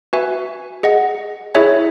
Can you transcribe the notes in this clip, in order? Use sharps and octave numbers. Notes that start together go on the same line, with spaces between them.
F#4 B4 E5 G#5
G#4 D#5 F#5
E4 G#4 C#5 E5 G#5